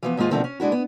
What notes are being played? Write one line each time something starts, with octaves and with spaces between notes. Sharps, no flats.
E3 F3 B3
D#2 G#2 G#3 F4 G#5
B2 D3 D#3 F3 A3 C4
C#4
G#3 D4 E4 F#4
B3